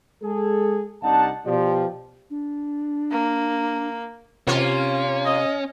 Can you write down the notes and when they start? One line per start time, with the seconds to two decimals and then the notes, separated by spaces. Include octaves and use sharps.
0.22 G#3 G#4 A4
1.02 C2 C3 D4 D#4 F#5 A5
1.46 B2 F3 G4 D5
2.30 D4
3.11 A#3
4.47 C3 A#3 C#4 F4
5.25 D#5